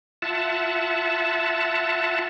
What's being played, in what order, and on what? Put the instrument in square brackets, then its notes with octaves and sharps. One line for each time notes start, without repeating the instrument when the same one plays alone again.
[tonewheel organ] F4 E5 F#5 A5